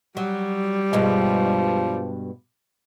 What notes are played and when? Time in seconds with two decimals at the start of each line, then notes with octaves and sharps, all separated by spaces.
0.17 F#3 G3
0.93 G2 B2 F3 G#3